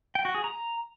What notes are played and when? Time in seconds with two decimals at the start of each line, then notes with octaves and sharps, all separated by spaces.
0.15 G5
0.25 F#4
0.35 G#4
0.44 A#5